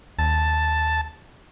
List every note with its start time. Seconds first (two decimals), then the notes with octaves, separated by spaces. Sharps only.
0.19 D#2 A5